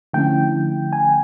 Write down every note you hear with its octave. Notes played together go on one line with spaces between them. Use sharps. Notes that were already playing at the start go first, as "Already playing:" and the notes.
D3 F3 A3 C#4 E4 G5
G#5